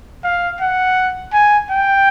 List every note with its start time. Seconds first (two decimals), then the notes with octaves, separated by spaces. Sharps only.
0.24 F5
0.61 F#5
1.33 G#5
1.70 G5